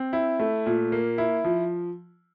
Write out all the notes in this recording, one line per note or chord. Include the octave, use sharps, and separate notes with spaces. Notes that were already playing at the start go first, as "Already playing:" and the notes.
Already playing: C4
E4
A3
A#2
A#3
E4
F3